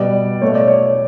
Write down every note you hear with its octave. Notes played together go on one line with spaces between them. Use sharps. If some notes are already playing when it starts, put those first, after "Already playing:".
Already playing: B2 G3 D5
B2 A3 C#5
D5
C#5